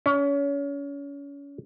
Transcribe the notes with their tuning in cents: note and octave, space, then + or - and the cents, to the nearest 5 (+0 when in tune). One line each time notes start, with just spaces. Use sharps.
C#4 +30